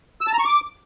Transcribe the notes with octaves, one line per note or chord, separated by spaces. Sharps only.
E6
A5
A#5
C#6
D6